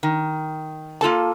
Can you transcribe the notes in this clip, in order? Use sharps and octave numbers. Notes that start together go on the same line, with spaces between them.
D#3
A#3 F4 A4 A5